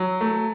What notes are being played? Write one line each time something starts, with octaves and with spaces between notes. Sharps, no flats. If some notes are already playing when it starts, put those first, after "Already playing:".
Already playing: F#3
A3